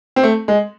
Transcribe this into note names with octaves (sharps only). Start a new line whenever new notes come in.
C4
A3
G#3